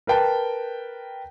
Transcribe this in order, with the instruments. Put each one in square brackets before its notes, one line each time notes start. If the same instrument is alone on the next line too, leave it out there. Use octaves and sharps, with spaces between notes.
[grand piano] A#4 B4 G5 A5